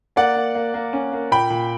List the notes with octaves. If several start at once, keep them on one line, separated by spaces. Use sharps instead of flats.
A#3 D5 F#5
A#3
A#3
A#3
C#4
A#3
A#2 G5 B5
A#2